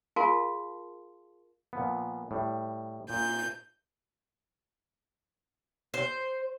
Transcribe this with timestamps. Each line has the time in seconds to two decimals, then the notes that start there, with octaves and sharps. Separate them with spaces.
0.16 F4 G#4 A#4 F5 A5 C6
1.73 A#2 F3 B3
2.31 A2 G3
3.10 A#2 G6
5.94 C5